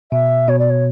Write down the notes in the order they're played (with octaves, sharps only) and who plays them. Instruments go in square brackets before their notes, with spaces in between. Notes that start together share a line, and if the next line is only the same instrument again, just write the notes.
[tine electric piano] B2 [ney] E5
[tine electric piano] B2 [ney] C#5
[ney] D5
C#5